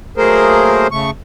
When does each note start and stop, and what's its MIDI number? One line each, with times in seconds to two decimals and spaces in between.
0.17 0.87 54
0.17 0.87 57
0.17 0.87 58
0.17 0.87 68
0.17 0.87 70
0.17 0.87 72
0.91 1.11 49
0.91 1.11 57
0.91 1.11 85